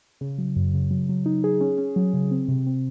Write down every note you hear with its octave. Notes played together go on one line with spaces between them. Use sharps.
C#3
F#3
F#2
C#3
F#3
F#3
D#4
G#4
C#4
C#4
F#3
C#3
C4
C3
C4